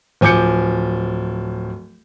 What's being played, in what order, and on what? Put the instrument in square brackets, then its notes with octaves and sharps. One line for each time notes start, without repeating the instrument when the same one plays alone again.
[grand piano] D1 F3 G#5 D6 G6 C#7